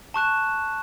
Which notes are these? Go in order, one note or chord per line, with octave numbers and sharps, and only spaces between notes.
A5 C#6 F#6 E7